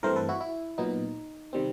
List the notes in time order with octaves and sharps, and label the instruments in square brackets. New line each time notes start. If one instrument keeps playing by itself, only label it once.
[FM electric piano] G2 E3 A3 C4 A#4 C5
A4 B4
E4 F#4
E4
A#2 F#3 B3 D#4
C3 D#3 G3 C4